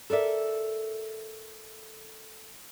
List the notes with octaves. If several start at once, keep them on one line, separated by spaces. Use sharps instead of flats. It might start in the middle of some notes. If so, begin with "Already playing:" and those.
A4 A#4 D5 E5